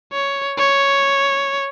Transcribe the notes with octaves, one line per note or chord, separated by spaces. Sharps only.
C#5
C#5